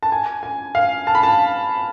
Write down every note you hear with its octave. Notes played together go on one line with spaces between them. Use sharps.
A5
G#5
G#5
F5
A5
B5
A5